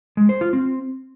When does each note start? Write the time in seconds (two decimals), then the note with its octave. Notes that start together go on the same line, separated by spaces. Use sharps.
0.17 G#3
0.29 C5
0.41 F4
0.53 C4